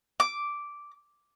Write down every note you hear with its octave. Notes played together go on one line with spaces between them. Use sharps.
D6